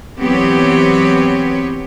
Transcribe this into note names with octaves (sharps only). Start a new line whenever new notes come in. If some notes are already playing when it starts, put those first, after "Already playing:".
E3 F#3 B3 C4 G4 C#5